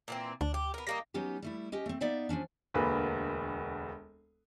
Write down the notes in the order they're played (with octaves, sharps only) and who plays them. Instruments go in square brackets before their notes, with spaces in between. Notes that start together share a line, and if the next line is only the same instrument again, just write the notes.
[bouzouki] A#2 E3 C4
[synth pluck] D2 [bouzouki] D4
[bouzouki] G4
B3 A#4
[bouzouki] G3 A#3 D#4 [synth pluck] A#6
[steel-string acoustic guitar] F#3 B3 C#4 D#4 G4
G3 A3 E4
C#4 G4 D#5
A3 C4
B3 D#4 D5 E5 F5
F3 F#3 C#4 D4
[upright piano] E1 D2 A#3 B4